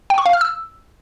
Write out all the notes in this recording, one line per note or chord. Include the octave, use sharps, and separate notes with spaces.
G5
C#6
F5
F6
E6